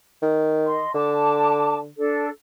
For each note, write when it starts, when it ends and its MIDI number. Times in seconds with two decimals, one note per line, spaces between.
0.22 0.80 51
0.66 0.91 75
0.66 0.91 84
0.94 1.88 50
0.94 1.78 81
0.94 1.78 86
1.98 2.28 62
1.98 2.28 69